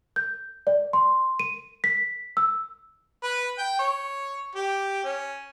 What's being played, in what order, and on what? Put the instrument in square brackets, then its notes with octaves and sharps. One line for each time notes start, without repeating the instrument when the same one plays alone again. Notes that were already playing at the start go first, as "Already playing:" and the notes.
[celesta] G6
D5
C6
D#7
B6
E6
[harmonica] B4
G5
C#5
G4
C#4